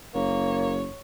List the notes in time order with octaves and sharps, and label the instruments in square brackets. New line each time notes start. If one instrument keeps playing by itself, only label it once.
[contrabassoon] F#1 [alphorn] A#3 [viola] C#5